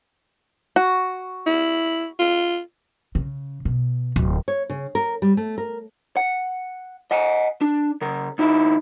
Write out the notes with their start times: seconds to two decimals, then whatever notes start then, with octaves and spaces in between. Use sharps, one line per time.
0.76 F#4
1.46 E4
2.19 F4
3.15 C#3
3.65 B2
4.16 D1
4.48 C#5
4.70 C#3
4.95 A#4
5.22 G3
5.37 A3
5.58 A#4
6.17 F#5
7.11 D#5 F#5 G#5
7.61 D4
8.01 C#3 A#4
8.38 D2 D#4 E4